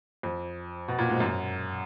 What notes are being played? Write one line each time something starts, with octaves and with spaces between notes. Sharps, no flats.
F2
B2
A#2
G#2
F#2